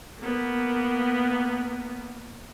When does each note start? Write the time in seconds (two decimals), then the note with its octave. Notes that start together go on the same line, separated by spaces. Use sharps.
0.19 A#3 B3